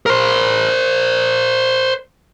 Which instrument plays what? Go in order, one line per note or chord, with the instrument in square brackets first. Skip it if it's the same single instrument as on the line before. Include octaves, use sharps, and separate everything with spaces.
[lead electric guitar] A#4 C5